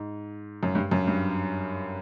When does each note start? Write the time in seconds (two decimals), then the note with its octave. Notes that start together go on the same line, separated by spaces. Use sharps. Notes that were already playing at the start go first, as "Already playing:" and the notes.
Already playing: G#2
0.63 F#2
0.75 G2
0.91 F#2
1.07 G2